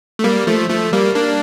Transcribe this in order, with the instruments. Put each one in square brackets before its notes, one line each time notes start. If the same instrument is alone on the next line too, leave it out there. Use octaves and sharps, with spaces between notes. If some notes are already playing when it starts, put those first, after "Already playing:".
[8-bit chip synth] A3
G3 A#3
F3 A3
F3 A3
G3 A#3
A#3 D4